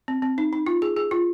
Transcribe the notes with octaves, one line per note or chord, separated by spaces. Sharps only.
C4
C4
D#4
D#4
F4
G#4
G#4
F4